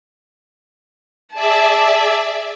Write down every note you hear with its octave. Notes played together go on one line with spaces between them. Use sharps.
G#4 D5 E5 A5